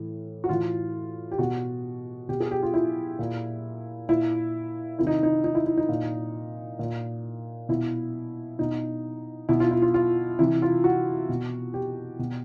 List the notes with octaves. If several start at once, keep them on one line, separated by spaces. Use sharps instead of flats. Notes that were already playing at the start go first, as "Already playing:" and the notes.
Already playing: A2 E3
F#4
A2 E3 F4
G4
B2 F#4
B2 G4
G#4
G4
F4
E4
A#2
A#2 E4
C3 D#3 E4
D#4
D#4
D#4
E4
E4
D#4
A#2
A#2
B2 E4
B2 D#4
B2 E4
F4
E4
F4
F4
C3 E3 E4
F4
F#4
B2
G4
B2